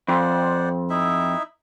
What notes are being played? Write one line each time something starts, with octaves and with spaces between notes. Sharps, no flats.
F2 C5 D5 F#5
D#4 E4 E5